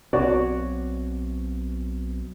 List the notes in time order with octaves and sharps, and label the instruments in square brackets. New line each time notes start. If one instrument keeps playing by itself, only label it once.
[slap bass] B1 B2 C4 [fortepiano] F#4 C#5 D5